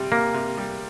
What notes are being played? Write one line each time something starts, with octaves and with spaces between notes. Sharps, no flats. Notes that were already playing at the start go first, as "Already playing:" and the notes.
Already playing: C3 G3
C3 A#3
C3
G3